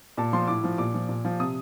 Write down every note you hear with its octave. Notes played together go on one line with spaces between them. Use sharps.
A#2 A5
F3 C6
A2 D6
F3
A#2 D6
F3
A#2
F3
C3 D#6